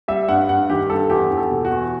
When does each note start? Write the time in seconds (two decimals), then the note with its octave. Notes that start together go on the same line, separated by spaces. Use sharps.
0.08 G3 E5
0.29 G2 F#5
0.49 G2 F#5
0.70 D#3 G4
0.90 G2 A4
1.09 E2 G4
1.30 E2
1.37 A4
1.51 B2
1.65 F#4
1.71 E2